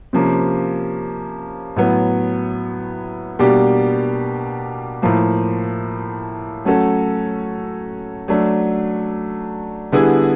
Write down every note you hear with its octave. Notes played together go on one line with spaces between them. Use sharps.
C3 F3 A#3 C#4
A2 F#3 B3
B2 G3 A#3 D4 G4
A2 F3 A#3
F#3 A3 C#4 F#4 A4
F#3 A3 D4
D3 G3 B3 E4 G#4